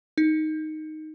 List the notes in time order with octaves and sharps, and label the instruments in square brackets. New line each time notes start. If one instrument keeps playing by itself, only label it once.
[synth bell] D#4